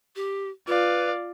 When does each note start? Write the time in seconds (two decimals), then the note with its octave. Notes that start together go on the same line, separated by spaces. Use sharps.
0.16 G4
0.68 F4 B4 D5 F5